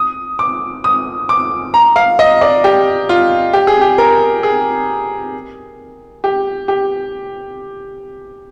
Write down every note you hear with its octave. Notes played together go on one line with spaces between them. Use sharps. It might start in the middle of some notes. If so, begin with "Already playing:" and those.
Already playing: D#6
D6
D#6
D6
A#5
F5
D#5
D5
G4
F4
G4
G#4
G4
A#4
G#4
G4
G4